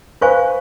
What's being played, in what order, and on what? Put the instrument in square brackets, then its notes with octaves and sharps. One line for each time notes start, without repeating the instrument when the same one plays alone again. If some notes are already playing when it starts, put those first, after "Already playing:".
[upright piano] B4 [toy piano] C5 F5 G#5 C#6